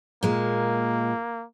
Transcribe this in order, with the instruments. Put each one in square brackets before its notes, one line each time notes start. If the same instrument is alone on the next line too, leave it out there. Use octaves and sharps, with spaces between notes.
[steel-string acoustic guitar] A#2 G#3 [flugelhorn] A#3